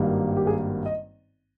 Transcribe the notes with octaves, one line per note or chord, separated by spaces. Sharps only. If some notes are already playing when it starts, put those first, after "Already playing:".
Already playing: G#1 G2 D#3 G3 A#3
G4
G#4
D#5